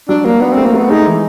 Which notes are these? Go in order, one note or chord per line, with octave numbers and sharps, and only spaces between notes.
F#3 D4
F#3 A#3
B3 D4
A3 C4
A#3
A3 B3
G#3 D#4
E3